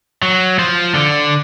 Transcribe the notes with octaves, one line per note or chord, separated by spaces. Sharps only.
F#3
F3
D3